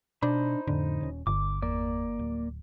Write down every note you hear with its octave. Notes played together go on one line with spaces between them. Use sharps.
B2 D4 D#4 C5 B5
F2 A2 D3
D#1 C#4
G1 G2 D3 D6
E2 A#3 D5
D1